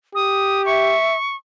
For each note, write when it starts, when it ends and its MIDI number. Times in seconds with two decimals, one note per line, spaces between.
0.15 0.96 67
0.15 0.65 87
0.66 1.15 76
0.66 1.36 85